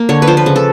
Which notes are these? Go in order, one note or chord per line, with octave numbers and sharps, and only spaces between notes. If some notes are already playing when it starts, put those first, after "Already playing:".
Already playing: A#3
D3 C#5
B4
F3 C5
B4
C#3
A4